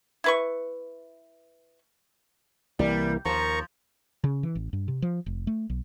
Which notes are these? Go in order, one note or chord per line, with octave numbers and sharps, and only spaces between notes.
E4 B4 C#6
C2 E3 G3 A#3
D#2 F3 A#4 A#5 C#6
C#3
E3
A1
G2
C3
F3
F1
A3
B1